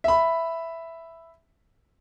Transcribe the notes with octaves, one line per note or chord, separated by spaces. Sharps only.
E5 B5